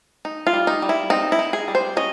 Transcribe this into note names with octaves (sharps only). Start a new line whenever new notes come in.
D#4
F4
G3
D#4
G3
E4
C4 D#4
E4
D#4
G#4
G3
C5
C#4 D#5